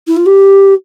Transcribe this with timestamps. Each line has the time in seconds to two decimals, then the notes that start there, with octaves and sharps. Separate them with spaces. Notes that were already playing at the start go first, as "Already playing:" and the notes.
0.07 E4
0.16 F4
0.26 G4